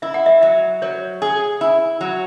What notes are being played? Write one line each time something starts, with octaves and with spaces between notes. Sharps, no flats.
E4 E5
F#5
E5
F#3 E5
F#3 C#5
G#4
E4
F#3